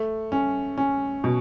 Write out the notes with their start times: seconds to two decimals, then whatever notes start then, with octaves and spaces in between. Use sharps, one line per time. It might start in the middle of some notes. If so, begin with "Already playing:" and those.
Already playing: A3
0.32 C#4
0.78 C#4
1.24 B2